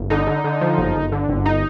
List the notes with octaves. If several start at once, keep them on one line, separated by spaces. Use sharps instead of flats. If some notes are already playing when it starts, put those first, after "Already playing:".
Already playing: G1
D3 D#4
D3
D3
F3
G1
G1
D3
G1
D#4